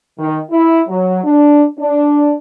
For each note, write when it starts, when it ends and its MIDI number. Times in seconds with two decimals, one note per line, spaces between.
0.19 0.40 51
0.51 0.82 64
0.88 1.19 54
1.24 1.64 62
1.79 2.35 62